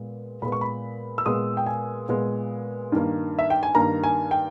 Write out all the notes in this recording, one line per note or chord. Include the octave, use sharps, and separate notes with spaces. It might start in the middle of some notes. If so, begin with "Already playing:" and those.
Already playing: A#2 G#3 B3
A#2 G#3 B3 B5
C#6
B5
E6
A#2 G#3 B3 D#6
G5
G#5
A#2 G#3 B3
G2 D#3 A#3
E5
G5
G#5
G2 D#3 A#3 A#5
G#5
G5